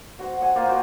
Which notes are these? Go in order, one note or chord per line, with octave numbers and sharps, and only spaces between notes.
F#4 C5
F#5 G#5
A#3 F4 A#4 C5
F#4 C5 G5